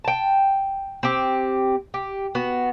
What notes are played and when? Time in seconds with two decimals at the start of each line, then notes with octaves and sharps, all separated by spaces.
0.04 G5 A5
1.03 C4 G4
1.94 G4
2.35 B3 F#4